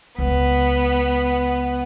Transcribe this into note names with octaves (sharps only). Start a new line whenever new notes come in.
C#2 B3